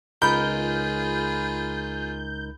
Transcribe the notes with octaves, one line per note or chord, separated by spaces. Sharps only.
C#2 D#4 F4 G#4 A#4 B5 G6